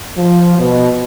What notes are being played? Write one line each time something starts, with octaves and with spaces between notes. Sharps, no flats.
F3
B2